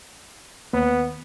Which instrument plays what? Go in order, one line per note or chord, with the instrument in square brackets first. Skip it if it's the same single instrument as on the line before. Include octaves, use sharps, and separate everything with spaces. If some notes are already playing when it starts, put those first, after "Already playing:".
[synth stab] D#2 [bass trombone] B3